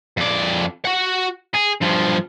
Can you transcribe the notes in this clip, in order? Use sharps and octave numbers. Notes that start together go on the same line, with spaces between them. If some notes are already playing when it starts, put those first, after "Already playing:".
F2 D5
F#4 F#5
G#4
G2 F3